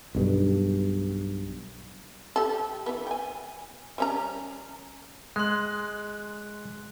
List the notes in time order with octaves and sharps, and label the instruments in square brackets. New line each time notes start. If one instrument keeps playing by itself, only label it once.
[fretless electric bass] B1 G2
[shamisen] G4 A4
E3 B3
G5 G#5
G3 C#4 A#5
[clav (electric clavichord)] G#3 [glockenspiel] C6 F#6